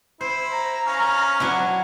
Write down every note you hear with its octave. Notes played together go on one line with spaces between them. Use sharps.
E4 C5
A#5
C#4 F5
F#3 D4 E4